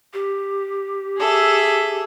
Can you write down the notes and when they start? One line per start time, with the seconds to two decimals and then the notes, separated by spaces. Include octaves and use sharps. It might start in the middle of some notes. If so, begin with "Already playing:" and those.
0.13 G4
1.17 G#4 A4 E5